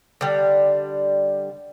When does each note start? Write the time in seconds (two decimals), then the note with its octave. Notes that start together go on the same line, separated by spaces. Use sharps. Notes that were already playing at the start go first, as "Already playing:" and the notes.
0.21 D3 G3